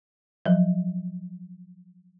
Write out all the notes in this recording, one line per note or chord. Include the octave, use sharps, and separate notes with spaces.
F3 F#3